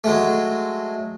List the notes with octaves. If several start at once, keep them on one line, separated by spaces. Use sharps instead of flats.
F#3 G#3 A3